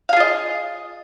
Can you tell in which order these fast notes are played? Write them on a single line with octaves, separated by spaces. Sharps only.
F5 G#4 F4 D#5